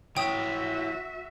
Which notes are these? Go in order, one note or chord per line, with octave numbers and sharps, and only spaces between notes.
E3 F#4 C#5 E5 G5 D#6